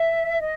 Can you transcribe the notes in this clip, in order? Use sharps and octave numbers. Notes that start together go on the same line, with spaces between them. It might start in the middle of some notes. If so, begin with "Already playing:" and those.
Already playing: E5
D#5